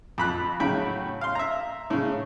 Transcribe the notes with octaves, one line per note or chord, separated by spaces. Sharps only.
F2 B5 F#6
A2 C#3 F#3 G5 B5
F5 C6
E5 A#5
A2 C#3